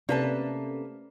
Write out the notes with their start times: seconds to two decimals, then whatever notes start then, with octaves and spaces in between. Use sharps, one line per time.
0.09 C3 A3 A#3 C#4 B4 D5 A5